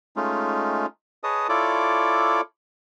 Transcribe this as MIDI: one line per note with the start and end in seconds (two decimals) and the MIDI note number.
0.16 0.86 56
0.16 0.86 57
0.16 0.86 61
0.16 0.86 63
0.16 0.86 65
1.24 1.47 68
1.24 1.47 71
1.24 1.47 73
1.24 1.47 75
1.24 1.47 81
1.24 1.47 87
1.49 2.41 64
1.49 2.41 65
1.49 2.41 69
1.49 2.41 73
1.49 2.41 74
1.49 2.41 86